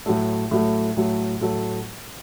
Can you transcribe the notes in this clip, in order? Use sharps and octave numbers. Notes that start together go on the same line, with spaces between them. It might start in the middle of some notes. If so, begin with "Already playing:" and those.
A2 F#3 A3
A2 F#3 A3
A2 F#3 A3
A2 F#3 A3